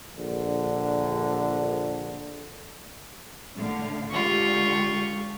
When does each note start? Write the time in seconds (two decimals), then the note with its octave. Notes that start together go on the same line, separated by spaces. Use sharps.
0.17 A#1 D3
3.56 A2 D3 F5
4.11 D3 G#3 F4 G4 C#6